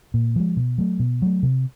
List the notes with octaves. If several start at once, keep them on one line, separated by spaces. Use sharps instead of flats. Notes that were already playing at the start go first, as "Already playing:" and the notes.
A#2
F3 G#3
B2
F#3 A3
B2
F#3 A3
C3